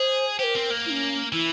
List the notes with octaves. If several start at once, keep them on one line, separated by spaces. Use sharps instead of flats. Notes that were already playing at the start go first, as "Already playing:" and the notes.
Already playing: G#4 C5
G4 A#4 C5
C4
A#3
E4
C#4
E3 E4